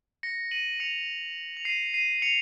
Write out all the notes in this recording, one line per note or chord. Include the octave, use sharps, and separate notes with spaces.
A#6 C#7
D#7 F#7
C#7 F7
F7
C7 D#7
C7 D#7
C#7 F7